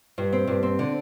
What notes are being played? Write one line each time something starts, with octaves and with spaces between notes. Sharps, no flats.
G2
C4
G2
C4
D3